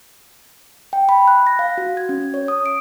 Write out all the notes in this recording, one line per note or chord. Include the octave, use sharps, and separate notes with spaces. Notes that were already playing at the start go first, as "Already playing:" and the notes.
G5
B5
F#6
A#6
F5
F#4
G#6
C#4
C#5
D#6
D7